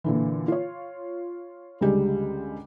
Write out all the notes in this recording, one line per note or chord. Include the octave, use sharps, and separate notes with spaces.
A#2 D3 E3
F4 C#5
C#2 D3 G3 G#3